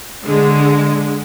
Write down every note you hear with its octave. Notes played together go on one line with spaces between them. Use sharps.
D3 G#3